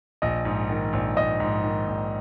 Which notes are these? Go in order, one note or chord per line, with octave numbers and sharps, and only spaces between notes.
A#1 D#5
G#2
D#3
A#1
A#1 D#5
G#2
D#3
A#1